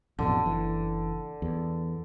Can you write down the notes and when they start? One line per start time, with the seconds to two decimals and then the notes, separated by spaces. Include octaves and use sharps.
0.19 A1 F2 B2 D3
0.46 F#1 E3
1.42 E2